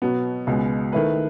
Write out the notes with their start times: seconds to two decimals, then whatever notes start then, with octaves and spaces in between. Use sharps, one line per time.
0.02 B2 F#3 B3
0.47 C#2 B2 G#3 B3
0.93 D#3 A3 E4 B4